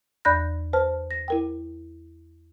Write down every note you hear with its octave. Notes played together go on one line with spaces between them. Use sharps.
E2 D5 B5 F#6 G6 A#6
B4 C5 A5 F6
A#6
E4 A#4 G5